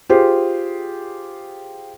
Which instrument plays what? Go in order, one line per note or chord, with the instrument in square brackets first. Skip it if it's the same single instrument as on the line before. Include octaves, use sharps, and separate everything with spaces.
[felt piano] F4 G4 G#4 C5